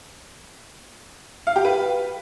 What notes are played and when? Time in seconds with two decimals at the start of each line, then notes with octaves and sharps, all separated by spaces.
1.47 F5
1.56 G4
1.65 B4